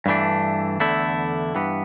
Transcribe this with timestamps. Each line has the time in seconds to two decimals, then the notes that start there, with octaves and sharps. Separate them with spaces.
0.06 G2 E3 A3 D4
0.80 E2 D3 A3 E4
1.55 G2 E3 B3